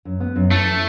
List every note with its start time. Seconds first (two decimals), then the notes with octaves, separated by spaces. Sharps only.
0.05 F#2
0.20 B3
0.36 F#2
0.51 E3 A3